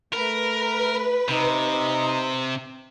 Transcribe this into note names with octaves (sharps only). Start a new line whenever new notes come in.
A3 A#4 B4
C3 D#4